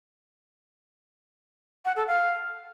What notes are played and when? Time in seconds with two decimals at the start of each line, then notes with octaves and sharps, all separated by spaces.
1.85 F#5
1.96 A4
2.07 F5